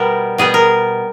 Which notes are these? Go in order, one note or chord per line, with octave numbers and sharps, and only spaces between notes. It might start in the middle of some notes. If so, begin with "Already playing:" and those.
Already playing: B2 G3 B3 A#4
B2 G3 B3 G#4
A#4